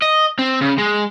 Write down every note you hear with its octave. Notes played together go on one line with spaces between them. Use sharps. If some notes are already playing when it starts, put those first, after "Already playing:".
D#5
C4
C#3
G#3